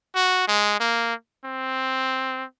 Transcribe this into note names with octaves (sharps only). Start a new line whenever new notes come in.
F#4
G#3
A#3
C4